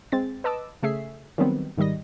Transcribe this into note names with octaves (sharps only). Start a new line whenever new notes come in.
G#3 C4 A6
B4 D#5 A5 D6 E6
C#3 A3 G#4 E5 C7
D#3 F#3 G3 B3 C4
G#2 D#3 G3 D#5 A#6